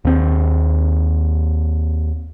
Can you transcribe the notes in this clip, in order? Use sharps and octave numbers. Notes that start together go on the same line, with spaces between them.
D#2 C4